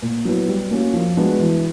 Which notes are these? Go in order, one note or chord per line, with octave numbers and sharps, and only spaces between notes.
A#2
F#3 B3 E4
G3
A#3 C#4 F#4
F3
G#3 B3 D4 F#4
E3